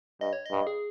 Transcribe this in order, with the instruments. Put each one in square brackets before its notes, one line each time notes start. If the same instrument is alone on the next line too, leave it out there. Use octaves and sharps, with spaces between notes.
[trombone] G2 [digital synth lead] D#5
[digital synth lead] C#5
D#5
[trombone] G2
[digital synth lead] G#4